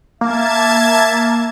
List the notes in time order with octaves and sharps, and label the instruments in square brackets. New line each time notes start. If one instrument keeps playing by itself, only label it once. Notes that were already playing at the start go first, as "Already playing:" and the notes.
[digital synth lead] A#3 [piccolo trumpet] E5 [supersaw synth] A5 G#6